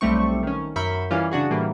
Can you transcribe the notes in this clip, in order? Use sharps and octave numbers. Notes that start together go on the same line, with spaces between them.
B1 G3 A3 C4 C#6
D#3 C#4
F#2 A#4 E5 B5 C#6 G6
E3 G3 C#4 F4
C#3 D4 F#4 G#4
A2 E3 G3 A#3